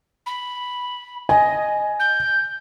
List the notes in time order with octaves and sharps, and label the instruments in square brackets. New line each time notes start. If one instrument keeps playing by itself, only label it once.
[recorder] B5
[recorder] D#5 [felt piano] G#5
[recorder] G6